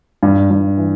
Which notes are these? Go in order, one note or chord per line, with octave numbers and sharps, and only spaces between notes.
G2
G2
E3